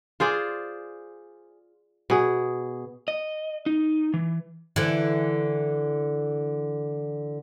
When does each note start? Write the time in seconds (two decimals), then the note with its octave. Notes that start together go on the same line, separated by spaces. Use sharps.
0.20 F4 G#4 C5 D5
2.10 B2 G#4
3.08 D#5
3.66 D#4
4.14 E3
4.76 D3 E3